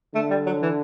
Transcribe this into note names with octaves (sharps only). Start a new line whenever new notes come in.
D3 A3
G3
F#3
E3